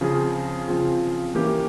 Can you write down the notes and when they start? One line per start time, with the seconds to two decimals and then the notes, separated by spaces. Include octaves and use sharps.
0.01 C#3 F3 C4 F4 G#4
0.67 C#3 F3 C4 F4 G#4
1.34 E3 A#3 C#4 G4